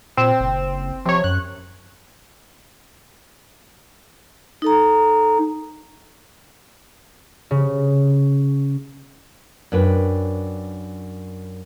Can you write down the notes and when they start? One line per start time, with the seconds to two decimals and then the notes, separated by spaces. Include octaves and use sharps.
0.17 A#2 C4 E7
0.40 F#1
1.06 C3 F3 C#5
1.24 F#2 F#6
4.62 D#4 A4 A#5
7.51 C#3
9.72 F#2 D4 B4 G5